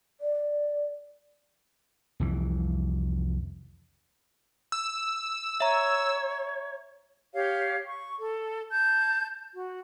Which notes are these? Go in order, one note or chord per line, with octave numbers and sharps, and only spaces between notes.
D5
C2 F2 E3
E6
C#5 E5 A#5
G4 C#5 F5
C#6
A4
A5 G6
F#4